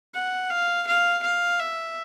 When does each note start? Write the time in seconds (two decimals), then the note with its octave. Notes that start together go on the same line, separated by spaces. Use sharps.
0.14 F#5
0.50 F5
0.87 F5
1.23 F5
1.60 E5